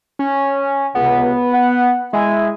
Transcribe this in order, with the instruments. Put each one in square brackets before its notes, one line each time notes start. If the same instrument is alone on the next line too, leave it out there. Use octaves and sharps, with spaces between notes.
[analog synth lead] C#4
[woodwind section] C#2 C3 [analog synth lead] B3
[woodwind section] F#5
[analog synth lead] G#3 [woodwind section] E4 E5 G#5